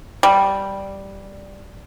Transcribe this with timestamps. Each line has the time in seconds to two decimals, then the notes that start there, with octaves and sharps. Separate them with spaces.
0.23 G3